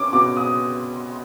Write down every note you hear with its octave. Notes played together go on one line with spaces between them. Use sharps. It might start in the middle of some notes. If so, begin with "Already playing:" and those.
Already playing: C#4 D6
B2 D6
D#6